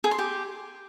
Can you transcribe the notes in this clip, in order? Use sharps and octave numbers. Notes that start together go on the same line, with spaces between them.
G#4
C6
G4